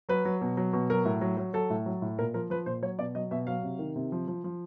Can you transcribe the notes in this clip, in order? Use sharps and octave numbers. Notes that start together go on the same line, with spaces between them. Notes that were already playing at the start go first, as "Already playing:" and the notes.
F#3 B4
F#3
B2
F#3
B2
F#3 A#4
A2
F#3
F#3
F#3 A4
A2
F#3
A2
A#2 A#4
F3 A#4
F3 B4
A#2 C5
F#3 C#5
B2 D5
F#3 D#5
B2 E5
F#3 F5
C3
D#3
C3
F3
F3
F3